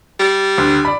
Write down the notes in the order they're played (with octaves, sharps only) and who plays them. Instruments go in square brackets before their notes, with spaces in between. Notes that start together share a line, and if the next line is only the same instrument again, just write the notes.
[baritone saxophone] G3
[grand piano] D2
D5 B5